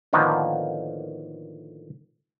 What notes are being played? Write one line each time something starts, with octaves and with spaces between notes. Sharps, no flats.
A2 D3 D#3 F3 A#3 B3